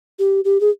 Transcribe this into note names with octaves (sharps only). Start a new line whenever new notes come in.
G4
G4
G#4